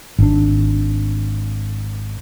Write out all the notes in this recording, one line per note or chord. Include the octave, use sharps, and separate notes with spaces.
G#1 D4